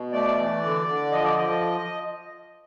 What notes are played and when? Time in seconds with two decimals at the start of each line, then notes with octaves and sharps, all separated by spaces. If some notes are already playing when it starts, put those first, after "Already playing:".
Already playing: B2
0.12 A3 D5
0.37 E3
0.63 D3
0.87 D3
1.11 F3 D#5
1.23 D5
1.36 F3 D#5